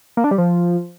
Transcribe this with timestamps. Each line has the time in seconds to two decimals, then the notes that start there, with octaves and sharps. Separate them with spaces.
0.17 A#3
0.24 D4
0.31 G3
0.38 F3